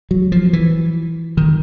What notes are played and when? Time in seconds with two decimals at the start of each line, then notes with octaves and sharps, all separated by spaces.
0.11 F#3
0.32 F3
0.53 E3
1.37 D#3